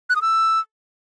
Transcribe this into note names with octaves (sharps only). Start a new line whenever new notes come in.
F#6
D#6
E6